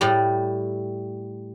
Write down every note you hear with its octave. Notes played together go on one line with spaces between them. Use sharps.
A2 G3 D5 A#5